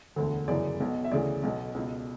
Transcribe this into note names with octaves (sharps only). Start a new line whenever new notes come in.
E1 D2 D3
G1 F#2 C#3 E3 D5
B1 B2
E5
D2 C#3 E3 D5
B1 B2
C#2 B2